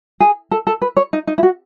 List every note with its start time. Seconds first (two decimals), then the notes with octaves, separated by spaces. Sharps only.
0.20 G#4
0.51 A4
0.67 A4
0.82 B4
0.97 C#5
1.13 D#4
1.27 D#4
1.38 E4
1.43 F#4